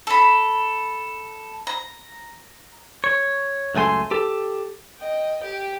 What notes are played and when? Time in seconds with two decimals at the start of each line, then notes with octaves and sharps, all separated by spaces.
0.07 A4 B5
1.67 A#5
3.04 C#5
3.75 C#2 F#2 A3 G#5 C6
4.11 G4 A4
4.99 D#5 G5
5.41 G4 G5